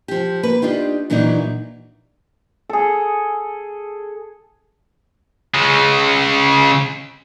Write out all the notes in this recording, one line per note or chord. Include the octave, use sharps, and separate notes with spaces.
F3 G4
A#3 B4
D4 D#4 F4 G4
A#2 E3 F#3 D4 D#4
G#4 A4
C#3 G#3